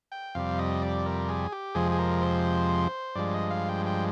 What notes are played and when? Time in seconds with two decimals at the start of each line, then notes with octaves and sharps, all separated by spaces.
0.12 G5
0.35 F2 C3 G3 F5
0.58 D#5
0.82 D5
1.06 A#4
1.28 G#4
1.52 G4
1.75 F2 C3 F3 G#3 G#4
1.92 G#4
1.99 A#4
2.22 C5
3.15 G2 F3 G#3 D5
3.34 D#5
3.50 F5
3.69 G5
3.86 G5